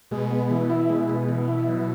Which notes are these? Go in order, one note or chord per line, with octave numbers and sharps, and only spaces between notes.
B2 G#3
B3
E3
E4
G#3
B3
E3
E4
F#3